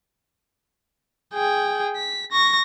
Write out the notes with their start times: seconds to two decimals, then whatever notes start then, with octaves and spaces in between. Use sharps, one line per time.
1.34 G#4 G5
1.96 B6
2.32 C#6 A#6